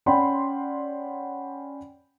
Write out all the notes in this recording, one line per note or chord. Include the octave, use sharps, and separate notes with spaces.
C#4 D5 F#5 G5 B5 C6